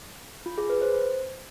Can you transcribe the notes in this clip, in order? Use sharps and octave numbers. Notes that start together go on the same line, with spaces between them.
F4
G#4
B4
C5